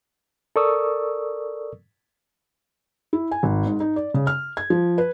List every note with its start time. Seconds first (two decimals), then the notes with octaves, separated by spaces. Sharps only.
0.56 A4 A#4 D5 C#6 D#6 E6
3.13 E4
3.31 G#5
3.43 G#1
3.66 G#2
3.80 D#4
3.96 D5
4.14 C#3
4.27 F6
4.57 G#6
4.70 F3
4.98 B4